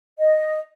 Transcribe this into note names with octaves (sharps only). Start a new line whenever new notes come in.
D#5